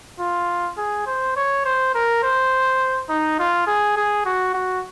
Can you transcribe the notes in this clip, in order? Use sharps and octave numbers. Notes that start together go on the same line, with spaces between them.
F4
G#4
C5
C#5
C5
A#4
C5
D#4
F4
G#4
G#4
F#4
F#4